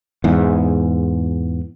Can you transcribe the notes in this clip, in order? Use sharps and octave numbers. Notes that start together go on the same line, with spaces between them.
E2 G#2